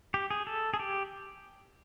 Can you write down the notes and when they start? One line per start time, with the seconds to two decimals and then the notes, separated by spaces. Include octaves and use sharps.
0.14 G4
0.31 G#4
0.47 A4
0.74 G#4
0.80 G4